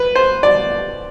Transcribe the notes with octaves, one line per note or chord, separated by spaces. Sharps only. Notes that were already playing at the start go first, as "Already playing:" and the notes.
Already playing: B4
C5
D5